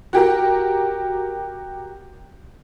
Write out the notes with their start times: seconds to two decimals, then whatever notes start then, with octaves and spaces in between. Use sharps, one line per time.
0.13 F#4 G4 A#4